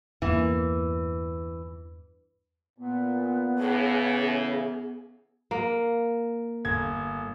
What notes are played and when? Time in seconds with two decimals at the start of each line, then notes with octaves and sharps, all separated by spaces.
0.22 E2 G2 E3 A#3
2.78 A#2 B3
3.58 A2 C#3 E3 G#4
5.51 A#3
6.65 G1 G#6